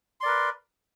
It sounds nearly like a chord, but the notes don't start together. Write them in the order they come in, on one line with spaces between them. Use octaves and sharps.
C6 D5 A#4 B4